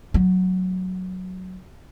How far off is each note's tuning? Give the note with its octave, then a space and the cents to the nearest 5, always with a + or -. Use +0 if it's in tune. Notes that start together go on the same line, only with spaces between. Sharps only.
F#3 +0 A3 +0